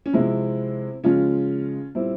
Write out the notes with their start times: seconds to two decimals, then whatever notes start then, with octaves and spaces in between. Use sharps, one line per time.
0.06 C#4
0.13 C3 F3 G#3 C4 E4
1.04 C#3 F3 G#3 C#4 F4
1.95 A#2 G3 C4 E4